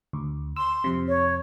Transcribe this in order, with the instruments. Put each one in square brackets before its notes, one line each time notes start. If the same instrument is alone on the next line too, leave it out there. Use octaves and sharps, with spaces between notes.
[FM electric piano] D2
[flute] C6 [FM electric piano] E6
[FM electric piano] F2 C3
[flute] C#5